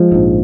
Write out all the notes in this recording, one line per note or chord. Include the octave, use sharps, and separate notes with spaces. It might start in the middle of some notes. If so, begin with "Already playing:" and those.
Already playing: F3 G#3
A#1 G#2